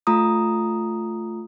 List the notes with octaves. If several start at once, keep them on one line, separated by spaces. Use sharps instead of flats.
A3 F4 A#5 D#6